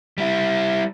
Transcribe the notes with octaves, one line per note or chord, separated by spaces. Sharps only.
G3 E4